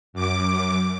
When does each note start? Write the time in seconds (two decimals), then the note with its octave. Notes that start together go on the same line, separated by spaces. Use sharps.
0.13 F#2 D6